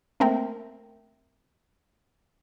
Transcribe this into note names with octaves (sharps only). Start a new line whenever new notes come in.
A3 A#3 C4 A#4 E5 G5